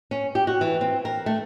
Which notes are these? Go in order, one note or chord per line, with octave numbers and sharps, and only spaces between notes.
C#4
G4
F#4
E3
C4
A#4
A3